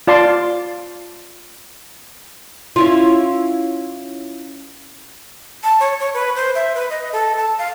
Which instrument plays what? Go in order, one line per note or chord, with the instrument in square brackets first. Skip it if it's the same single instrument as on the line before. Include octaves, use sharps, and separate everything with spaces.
[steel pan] F4 D5 A5 C6
[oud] C#4 E4 F4
[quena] A5
C#5
C#5
B4
C5
E5
B4
D#5
A4
A5
F5